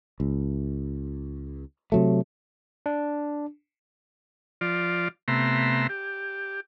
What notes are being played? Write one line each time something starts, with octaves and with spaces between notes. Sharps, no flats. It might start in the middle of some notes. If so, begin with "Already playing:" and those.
C#2
C3 F#3 A3
D4
F3 F4 D5
C3 A3 B3 E5 A#5 C6
G4